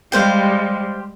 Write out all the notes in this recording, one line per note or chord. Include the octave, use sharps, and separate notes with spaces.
G3 G#3 G4 C5 F5